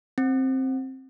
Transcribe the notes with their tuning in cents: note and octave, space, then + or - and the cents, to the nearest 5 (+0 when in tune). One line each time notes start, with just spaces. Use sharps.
C4 +10